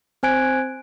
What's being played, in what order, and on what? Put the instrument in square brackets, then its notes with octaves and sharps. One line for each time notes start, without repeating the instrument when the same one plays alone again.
[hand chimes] C4 C5 G#5 F#6 G#6 D7